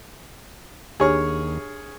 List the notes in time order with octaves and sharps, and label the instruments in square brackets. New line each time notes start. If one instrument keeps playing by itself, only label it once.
[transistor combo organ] D#2 [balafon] D4 G4 G#5 [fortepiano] G#4 C#5 F6